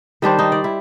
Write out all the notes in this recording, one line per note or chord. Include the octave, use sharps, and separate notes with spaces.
D#3 G3 D4 C5
D#4
D5
E4